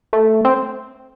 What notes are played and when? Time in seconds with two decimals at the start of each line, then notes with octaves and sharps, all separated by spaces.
0.13 A3
0.45 C4